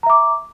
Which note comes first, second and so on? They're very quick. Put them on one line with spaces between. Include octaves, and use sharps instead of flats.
A#5 E5 D6